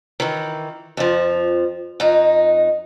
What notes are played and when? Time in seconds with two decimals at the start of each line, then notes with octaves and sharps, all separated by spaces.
0.20 D#3 E3
0.97 F2 F3
2.00 F2 D#4